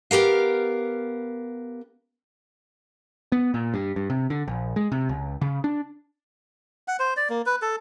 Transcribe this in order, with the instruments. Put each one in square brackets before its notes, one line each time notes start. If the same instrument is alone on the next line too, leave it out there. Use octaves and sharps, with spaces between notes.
[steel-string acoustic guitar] B3 G4 A#4 F5
[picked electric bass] B3
A#2
G2
G2
C3
D3
A#1
G#3
C3
C#2
C#3
D4
[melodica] F#5
C5
D5
A#3
B4
A4